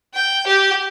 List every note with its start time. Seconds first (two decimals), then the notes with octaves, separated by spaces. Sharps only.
0.14 G5
0.47 G4